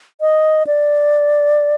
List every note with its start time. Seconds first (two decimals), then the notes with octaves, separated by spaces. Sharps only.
0.21 D#5
0.67 D5